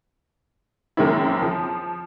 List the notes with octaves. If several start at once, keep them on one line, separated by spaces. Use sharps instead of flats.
F#2 D#3 G#3 A#3 C4 E4
F3